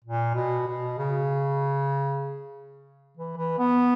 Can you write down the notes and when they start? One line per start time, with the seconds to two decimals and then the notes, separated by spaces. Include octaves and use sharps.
0.04 A#2
0.35 B2
0.67 B2
0.98 C#3
3.17 E3
3.37 E3
3.59 B3